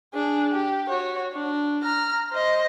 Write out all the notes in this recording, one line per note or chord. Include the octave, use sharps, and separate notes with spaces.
D4 G#4
G4
F#4 C#5
D4
A#5 F6
C5 D#5